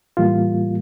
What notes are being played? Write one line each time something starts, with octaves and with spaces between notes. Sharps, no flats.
A2 E3 G3 A#3 F4